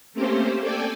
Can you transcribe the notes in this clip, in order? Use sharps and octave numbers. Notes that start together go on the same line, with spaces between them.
A3 A#3 C4 C#4 G4 C5
A4 D5 G5 G#5